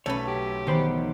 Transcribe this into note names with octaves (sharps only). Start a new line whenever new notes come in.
B1 A3 C#4 B4 C#5
G4
E2 D#3 B3 C5 B5